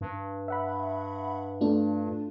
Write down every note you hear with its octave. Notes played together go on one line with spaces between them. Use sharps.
G2
E5 F#5 B5
A3 D4 F4